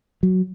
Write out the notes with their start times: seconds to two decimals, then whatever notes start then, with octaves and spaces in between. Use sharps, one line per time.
0.23 F#3